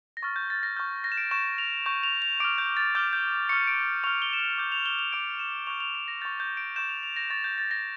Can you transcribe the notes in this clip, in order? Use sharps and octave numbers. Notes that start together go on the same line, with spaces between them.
A#6
C#6 F6 A6
G6
A6
A#6
C#6 F6 G6
A#6
E7
D7
C#6 G6 E7
F7
C#6 G6
F7
F7
D6 F6 D7
G6
A6
D6 F6 G6
G6
C#6 F6 C#7
D7
C#6 F6 F7
G7
E7
F7
D6 G6
F7
G7
F7
D6 G6 D7
E7
C#6 G6 F7
F7
D7
A#6
C#6 G6 A6
G6
D7
C#6 G6 E7
F7
F7
A#6
C#6 G6 A6
G6
A6
A#6